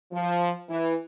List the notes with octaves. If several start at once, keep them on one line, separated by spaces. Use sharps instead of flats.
F3
E3